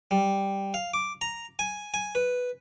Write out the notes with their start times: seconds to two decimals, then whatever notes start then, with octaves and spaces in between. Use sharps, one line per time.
0.11 G3
0.74 F5
0.94 D6
1.21 A#5
1.59 G#5
1.94 G#5
2.15 B4